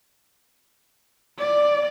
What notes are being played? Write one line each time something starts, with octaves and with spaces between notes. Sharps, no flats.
D5